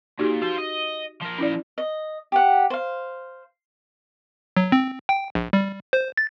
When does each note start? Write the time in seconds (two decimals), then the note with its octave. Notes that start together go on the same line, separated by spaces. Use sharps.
0.19 A#2 D#4 F#4 G4
0.42 F4 F#4 C5
0.58 D#5
1.21 F3 A#4
1.38 C#4 E4 D5
1.78 D#5
2.32 G4 F#5
2.70 C5 F5
4.57 F#3
4.72 C4
5.09 G5
5.35 A#1
5.53 G3
5.93 C5
6.17 A6